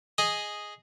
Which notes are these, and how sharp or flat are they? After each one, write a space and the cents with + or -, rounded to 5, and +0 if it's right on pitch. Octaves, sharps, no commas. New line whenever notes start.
G#4 +0 D#5 +0